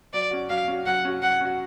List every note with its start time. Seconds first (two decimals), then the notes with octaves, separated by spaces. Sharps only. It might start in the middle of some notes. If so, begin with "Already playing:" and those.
0.13 F#3 D5
0.31 C#4 F#4
0.50 F#3 F5
0.68 C#4 F#4
0.86 F#3 F#5
1.05 C#4 F#4
1.22 F#3 F#5
1.41 C#4 F#4